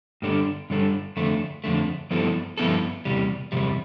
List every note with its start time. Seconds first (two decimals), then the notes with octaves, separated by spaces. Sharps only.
0.22 G2 D3 G3 D4 A4
0.70 G2 D3 G3 D4 A4
1.17 F2 D3 A3
1.64 F2 D3 A3
2.10 G2 F3 B3 E4 A4
2.58 G2 F3 B3 E4 A4
3.05 E2 C3 G3
3.52 E2 C3 G3